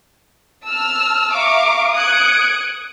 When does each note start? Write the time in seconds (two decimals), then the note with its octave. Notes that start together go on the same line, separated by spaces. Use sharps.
0.64 A5 E6 F6
1.33 E5 F5 A#5 C#6 D6
1.93 D#6 F#6 G#6 C#7 D7